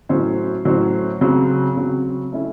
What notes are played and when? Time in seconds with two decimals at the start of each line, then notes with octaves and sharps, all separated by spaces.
0.09 A2 F#3 C#4 F#4 C5
0.65 A2 F#3 C#4 F#4 C5
1.21 C#3 F#3 C4
1.76 C#3 F#3 C4
2.32 A3 C#4 E4